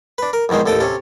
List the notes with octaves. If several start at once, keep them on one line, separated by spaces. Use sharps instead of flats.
D4 B4
A#4
A#1 E2 D#3 G#3 C5
A1 D#2 A4 G5 A5 D#6
C3 C#4 A4